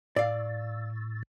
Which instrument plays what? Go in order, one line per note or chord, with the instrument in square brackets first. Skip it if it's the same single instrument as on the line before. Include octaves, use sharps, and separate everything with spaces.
[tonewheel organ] A2 [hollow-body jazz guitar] D5 F5